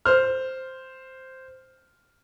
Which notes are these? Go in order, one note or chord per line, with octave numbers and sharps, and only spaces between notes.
C5 F6